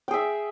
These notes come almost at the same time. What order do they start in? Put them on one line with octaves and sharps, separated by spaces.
G5 G#4 E5